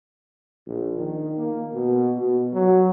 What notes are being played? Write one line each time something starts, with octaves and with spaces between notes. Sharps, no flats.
A#1
D#3
A#3
B2
B2
F#3